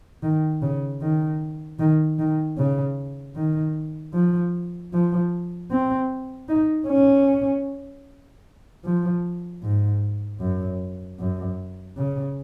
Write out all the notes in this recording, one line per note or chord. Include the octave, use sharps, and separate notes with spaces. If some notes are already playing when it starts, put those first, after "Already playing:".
D#3
C#3
D#3
D#3
D#3
C#3
D#3
F3
F3
C4
D#4
C#4
F3
G#2
F#2
F#2
C#3